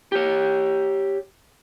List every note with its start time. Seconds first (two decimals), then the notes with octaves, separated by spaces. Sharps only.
0.12 G4 C#5